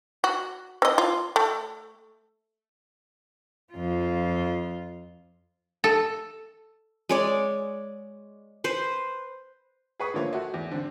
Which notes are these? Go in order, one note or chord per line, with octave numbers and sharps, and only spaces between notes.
F#4
C4 D#5
F4
A3
F2 F4
A4
G#3 C#5 D5
B4 C5
G#4 B4 C#6 D#6
D3 F3 A3 A#3 C5 C#5
A3 F#4
E2
D3 C4